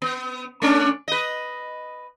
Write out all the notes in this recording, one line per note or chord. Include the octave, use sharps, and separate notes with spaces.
B3
A3 C#4 D4
B4 D#5